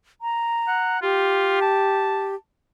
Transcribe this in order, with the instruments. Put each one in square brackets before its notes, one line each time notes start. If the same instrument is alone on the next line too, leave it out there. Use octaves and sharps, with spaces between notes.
[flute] A#5
[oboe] F#5
[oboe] F4 [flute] G4
[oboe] A5